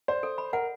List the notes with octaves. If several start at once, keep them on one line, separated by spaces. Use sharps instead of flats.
C5 D5
A4
B5
A#4 F#5